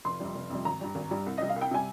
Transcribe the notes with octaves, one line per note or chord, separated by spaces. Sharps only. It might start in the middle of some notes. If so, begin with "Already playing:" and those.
F1 C6
F2 C3 G3
F1
F2 C3 G3
G#1 A#5
G2 G3
G#1
G2 G3
C2
C3 G3 D#5
F5
C2
G5
C3 G3 G#5